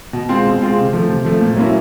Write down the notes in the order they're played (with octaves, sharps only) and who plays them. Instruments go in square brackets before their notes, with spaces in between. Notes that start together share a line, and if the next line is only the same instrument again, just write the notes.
[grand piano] B2
G#3 C4 F4
B2
G#3 C4 F4
C3
F3 A3
C3
F3 A3
A#2
F#3 A#3 C#4 E4